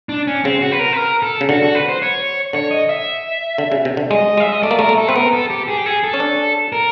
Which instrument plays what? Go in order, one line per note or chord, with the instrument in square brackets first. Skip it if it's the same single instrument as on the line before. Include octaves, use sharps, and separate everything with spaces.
[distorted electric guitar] D4
C#4
[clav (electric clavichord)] C#3 [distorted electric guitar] C4
[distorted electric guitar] F#4
B4
A#4
B4
A#4
A4
[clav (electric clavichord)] C#3
[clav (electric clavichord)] D3 [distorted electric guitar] F#4
[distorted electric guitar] F#4
B4
C5
C#5
[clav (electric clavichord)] D3 [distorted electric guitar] C#5
[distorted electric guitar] D#5
E5
[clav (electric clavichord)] D3
C#3
C3
D3
[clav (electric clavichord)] G#3 [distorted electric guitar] D#5
[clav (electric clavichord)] G#3 [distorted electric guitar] E5
[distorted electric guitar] D#5
[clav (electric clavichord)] A3 [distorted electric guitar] D5
[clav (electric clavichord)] A#3
[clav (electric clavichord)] A3 [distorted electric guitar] A#4
[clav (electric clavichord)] A3
[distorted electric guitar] A4
[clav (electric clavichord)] C4 [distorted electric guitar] B4
[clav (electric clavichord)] B3 [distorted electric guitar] A#4
[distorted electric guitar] A4
G4
G#4
G4
G#4
A4
[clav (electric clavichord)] C#4
D4
[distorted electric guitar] A#4